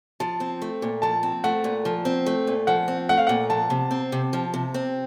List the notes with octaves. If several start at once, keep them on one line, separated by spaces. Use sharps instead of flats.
F3 A5
C4
A3
A#2
F3 A5
C4
A3 F#5
A#2
F3
C4
A3
A#2
F3 F#5
C4
A3 F#5
F5
A#2 F#5
F3 A5
C3
C4
C3
F3
C3
C4